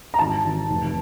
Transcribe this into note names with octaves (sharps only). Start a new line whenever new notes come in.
A#5
G#1 A5
G#1
F1